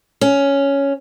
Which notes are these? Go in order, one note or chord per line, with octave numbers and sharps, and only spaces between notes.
C#4